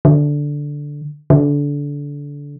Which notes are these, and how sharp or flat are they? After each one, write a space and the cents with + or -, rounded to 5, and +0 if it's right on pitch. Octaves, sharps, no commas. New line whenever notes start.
D3 -5
D3 -25